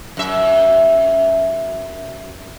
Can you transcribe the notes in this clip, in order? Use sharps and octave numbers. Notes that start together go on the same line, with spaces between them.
F#2 E5